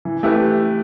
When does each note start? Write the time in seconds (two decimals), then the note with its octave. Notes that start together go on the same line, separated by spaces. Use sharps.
0.05 E3
0.23 A3 E4 G4 B4